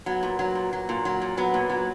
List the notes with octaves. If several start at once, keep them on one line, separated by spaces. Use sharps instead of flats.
F#3 B3
A#2
F#3
A#2
F#3
A#2
F#3
A#2
F#3 B3
A#2
F#3